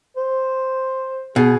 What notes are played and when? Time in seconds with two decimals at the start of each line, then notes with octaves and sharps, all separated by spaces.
0.17 C5
1.36 B2 G#4